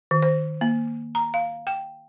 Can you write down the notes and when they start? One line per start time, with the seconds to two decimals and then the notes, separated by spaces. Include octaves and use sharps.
0.11 D#3
0.23 C5
0.61 A#3
1.15 A#5
1.34 F5
1.67 G5